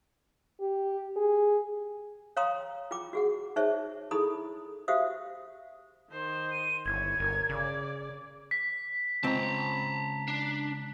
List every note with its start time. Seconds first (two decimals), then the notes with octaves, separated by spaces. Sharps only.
0.61 G4
1.16 G#4
2.37 C#5 F5 G5 A#5 C6 D#6
2.91 F4 G5 D6
3.13 F#4 G#4 F#5
3.56 D#4 G#4 C5 C#5 E5 A5
4.11 D#4 E4 G#4 A4 B5 D#6
4.88 F#4 G4 C5 E5 F5 D#6
6.10 D#3 C5
6.52 D#7
6.86 G1 E4 C#5 G#6
7.19 G1 A#4 C#5
7.49 C#3 D5
8.51 B6
9.24 C#2 C4 A5 A#5
10.28 D4